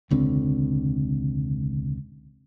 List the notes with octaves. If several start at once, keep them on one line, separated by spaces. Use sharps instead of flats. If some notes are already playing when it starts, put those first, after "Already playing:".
E1 C#2 D3 C4